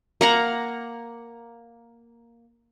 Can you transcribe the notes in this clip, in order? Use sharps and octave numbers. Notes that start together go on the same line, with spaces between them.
A#3 F#5 A#5